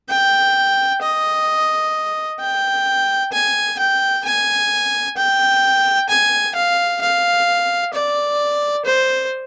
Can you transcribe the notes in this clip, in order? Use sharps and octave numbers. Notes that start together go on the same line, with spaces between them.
G5
D#5
G5
G#5
G5
G#5
G5
G#5
F5
F5
D5
C5